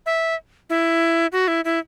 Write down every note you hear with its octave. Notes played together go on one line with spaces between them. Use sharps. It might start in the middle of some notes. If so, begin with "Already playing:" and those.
E5
E4
F#4
E4
E4